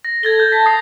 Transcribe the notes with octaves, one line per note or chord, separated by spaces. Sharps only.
A#6
A4 G#6 A6 G7
G6
A5 B6
D#6 C7